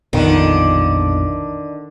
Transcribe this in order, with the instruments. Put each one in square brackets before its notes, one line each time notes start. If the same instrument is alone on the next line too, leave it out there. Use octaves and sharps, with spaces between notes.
[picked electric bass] A#1 F2 B2 [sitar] D3 D4 D#4 [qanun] D#3